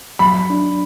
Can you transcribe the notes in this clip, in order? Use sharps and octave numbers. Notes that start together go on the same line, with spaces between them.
F#3 B5
D4